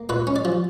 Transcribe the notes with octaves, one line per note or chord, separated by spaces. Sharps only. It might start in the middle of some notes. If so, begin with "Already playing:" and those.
Already playing: A#3
A#2 B4
C#4
D5
F3